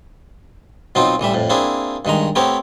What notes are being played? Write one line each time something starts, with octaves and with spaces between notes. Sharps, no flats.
B2 F#3 C4 D#4 F4
A1 E3 G3 E5
F2 A2
A#3 C4 D4 E4 G#4
G2 D#3 G#3 A#5
A3 B3 C4 G4 A#4 C#5